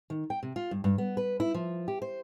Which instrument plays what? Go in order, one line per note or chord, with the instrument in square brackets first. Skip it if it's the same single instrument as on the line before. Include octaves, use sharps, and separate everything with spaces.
[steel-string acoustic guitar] D#3
G5
C3
F4
G2
G2
B3
B4
E4
F3
G4
C5